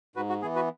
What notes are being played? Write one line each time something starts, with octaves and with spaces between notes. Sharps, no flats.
G#2 F#4 B4
F#4
E3 B3 G#4
F#4 B4